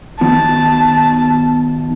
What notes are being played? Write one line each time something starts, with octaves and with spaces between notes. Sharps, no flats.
D#3 B3 F#4 A5